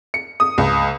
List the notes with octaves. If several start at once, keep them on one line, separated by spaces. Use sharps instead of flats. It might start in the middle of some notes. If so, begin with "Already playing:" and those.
C#7
D#6
C#2